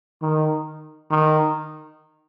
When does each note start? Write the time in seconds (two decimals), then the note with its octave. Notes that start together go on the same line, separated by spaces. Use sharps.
0.22 D#3
1.11 D#3